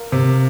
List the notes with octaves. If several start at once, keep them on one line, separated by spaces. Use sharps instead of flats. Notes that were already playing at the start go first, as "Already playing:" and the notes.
Already playing: A#4 F5
C3